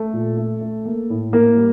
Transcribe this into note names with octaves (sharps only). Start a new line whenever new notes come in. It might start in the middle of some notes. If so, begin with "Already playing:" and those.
Already playing: A3 A4
A#2
A3
A3
A#3
A2
A2 A#3 A#4
G3